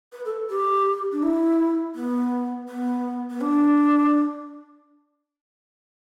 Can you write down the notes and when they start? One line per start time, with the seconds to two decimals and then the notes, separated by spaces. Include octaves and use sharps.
0.13 B4
0.25 A4
0.49 G4
1.12 D4
1.23 E4
1.95 B3
2.68 B3
3.30 B3
3.41 D4